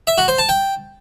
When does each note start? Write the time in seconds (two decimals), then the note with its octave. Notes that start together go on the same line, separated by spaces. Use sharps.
0.07 E5
0.18 F#4
0.28 C5
0.38 A5
0.49 G5